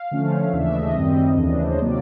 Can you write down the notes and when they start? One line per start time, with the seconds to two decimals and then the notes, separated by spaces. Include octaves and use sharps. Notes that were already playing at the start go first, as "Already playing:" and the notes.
Already playing: F5
0.11 D3 F3 A3 C#4
0.53 D#2 C#3 E3 A3 D4 E5
0.74 D#5
0.94 F#2 D#3 G3 C4
1.37 D#2 C#3 E3 A3 D4
1.63 C5
1.71 C#5
1.78 C3 D#3 F#3 A#3 D5